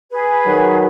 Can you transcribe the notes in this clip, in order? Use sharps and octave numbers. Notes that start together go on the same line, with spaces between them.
G#4 B4
D#3 F#3